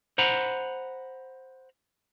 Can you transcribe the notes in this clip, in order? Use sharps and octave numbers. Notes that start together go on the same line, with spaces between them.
C5 F#5 A#5 B5